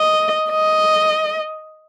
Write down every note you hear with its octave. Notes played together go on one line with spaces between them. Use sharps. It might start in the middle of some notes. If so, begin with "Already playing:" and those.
Already playing: D#5
D#5